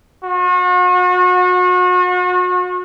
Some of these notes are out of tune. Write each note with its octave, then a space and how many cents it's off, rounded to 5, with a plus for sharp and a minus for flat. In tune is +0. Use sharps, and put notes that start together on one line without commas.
F#4 -40